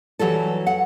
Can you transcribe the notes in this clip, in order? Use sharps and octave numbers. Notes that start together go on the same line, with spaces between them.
E3 F#3 G3 A4
F#5